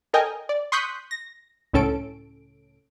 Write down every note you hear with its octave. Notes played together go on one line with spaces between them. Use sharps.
A4 A#4 D#5 G5 G#5
D5
C6 C#6 D#6 F#6 G6 B6
A#6
C#2 A2 C#4 A4 D7